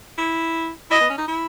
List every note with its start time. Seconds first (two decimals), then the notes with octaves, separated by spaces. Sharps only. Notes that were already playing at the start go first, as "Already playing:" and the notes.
0.18 E4
0.91 E4 D#5
1.01 B3
1.10 C#4
1.18 D#4
1.28 E4